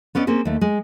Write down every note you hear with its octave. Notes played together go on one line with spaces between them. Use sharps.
B3 C#4 D5 D#5
A#3 C4 C#4 G#4
D#2 A3
G#3